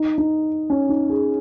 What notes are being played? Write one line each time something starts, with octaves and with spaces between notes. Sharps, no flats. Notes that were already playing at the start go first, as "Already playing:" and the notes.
Already playing: D#4
D#4
C#4
D#4
G#4